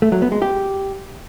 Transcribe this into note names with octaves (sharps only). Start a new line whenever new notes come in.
A3
F#3
B3
G#3
G4